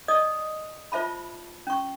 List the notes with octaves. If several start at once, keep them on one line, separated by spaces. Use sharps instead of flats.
D5 D#5 D#6
F4 C5 E5 A5 B5
C#4 C#6